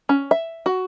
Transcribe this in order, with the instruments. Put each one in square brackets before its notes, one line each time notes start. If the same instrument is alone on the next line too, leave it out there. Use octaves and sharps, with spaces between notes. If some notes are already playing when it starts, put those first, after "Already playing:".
[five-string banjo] C#4
E5
F#4